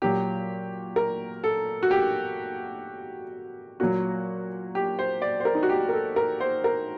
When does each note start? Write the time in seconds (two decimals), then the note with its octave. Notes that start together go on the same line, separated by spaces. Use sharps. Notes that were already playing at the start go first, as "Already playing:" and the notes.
0.02 A#2 F#3 G4
0.96 A#4
1.44 A4
1.83 F#4
1.91 G4
3.80 A#2 F#3 F#4
4.75 G4
4.99 C5
5.22 D5
5.40 C5
5.45 A#4
5.55 D#4
5.63 F#4
5.69 G4
5.89 A#4
5.93 A4
6.16 A#4
6.40 C5
6.64 A#4